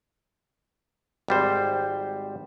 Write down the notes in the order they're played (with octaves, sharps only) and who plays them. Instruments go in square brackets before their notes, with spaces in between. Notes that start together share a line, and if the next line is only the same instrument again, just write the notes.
[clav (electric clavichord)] G#1 G3 C5